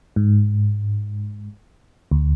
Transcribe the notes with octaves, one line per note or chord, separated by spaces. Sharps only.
G#2
D2